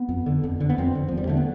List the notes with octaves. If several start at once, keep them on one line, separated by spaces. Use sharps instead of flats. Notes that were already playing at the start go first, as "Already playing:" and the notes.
Already playing: B3
F2
D3
F2
D3
B3
F2 C4
D3
E2 F3
G3
D3 A3
B3